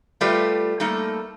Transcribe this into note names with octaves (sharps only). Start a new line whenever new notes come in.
G3 A3 F4 G4 B4 D5
G3 A3 A#3 D#4 A4